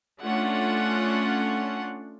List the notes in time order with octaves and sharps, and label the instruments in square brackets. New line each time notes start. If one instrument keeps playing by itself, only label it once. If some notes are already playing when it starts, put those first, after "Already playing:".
[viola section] A3 C#4 D4 F4 F#5